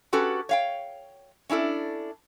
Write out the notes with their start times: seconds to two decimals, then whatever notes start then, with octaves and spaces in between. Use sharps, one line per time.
0.13 C#4 F#4 G4 A4 B4
0.49 C#5 F5 G5
1.50 C#4 D4 E4 A4